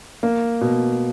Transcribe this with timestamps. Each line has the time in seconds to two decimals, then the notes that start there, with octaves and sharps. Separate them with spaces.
0.23 A#3
0.61 B2